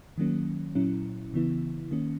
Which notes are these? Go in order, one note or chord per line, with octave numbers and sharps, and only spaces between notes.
D#3 F#3 A#3 C#4
A#2 F#3 C#4 E4
C#3 E3 B3 E4
D#3 A#3 C#4